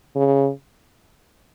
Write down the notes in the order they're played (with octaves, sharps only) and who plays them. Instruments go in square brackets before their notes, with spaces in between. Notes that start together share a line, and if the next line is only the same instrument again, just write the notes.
[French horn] C#3